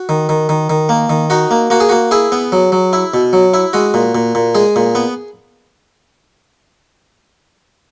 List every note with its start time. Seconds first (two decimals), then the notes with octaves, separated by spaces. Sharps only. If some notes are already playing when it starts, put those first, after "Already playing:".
Already playing: F#4
0.09 D#3
0.29 D#3
0.49 D#3
0.70 D#3
0.89 A#3
1.10 D#3
1.30 D#4 F#4
1.51 A#3
1.70 A#3 F#4
1.80 G#4
1.89 A#3 F#4
2.11 E4 G#4
2.32 B3
2.52 F#3
2.72 F#3
2.93 E4
3.14 B2
3.33 F#3
3.54 E4
3.73 G#3 F#4
3.94 A#2
4.15 A#2
4.35 A#2
4.55 G#3 G#4
4.76 A#2
4.95 B3